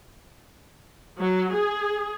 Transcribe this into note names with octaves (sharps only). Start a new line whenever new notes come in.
F#3
G#4